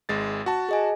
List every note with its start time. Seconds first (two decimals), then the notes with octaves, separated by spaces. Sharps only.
0.09 G#1 G#3 A6
0.46 F#4 A5
0.69 G#4 D#5 G#5